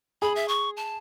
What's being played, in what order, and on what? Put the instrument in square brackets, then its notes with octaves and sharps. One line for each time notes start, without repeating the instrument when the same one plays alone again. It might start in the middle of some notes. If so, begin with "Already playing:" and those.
[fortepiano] G#4 [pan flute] B5
[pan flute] E5
C#6
A5